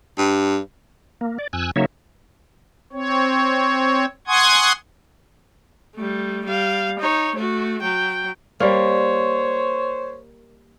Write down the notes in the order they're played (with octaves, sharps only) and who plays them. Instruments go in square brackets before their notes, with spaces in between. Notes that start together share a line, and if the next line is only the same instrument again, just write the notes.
[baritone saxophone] G2
[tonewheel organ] A#3
D5
F2 G#5 E6 F#6
C#3 F#3 A#3 D#4 C#5 E5
[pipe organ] C4 C#5
F#5 G#5 C6 C#6 D#6 G#6
[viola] G3 A3
G3 F5
D#4 C#5
A3 F#4
F#3 G5
[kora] G3 A#3 [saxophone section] C5 C#5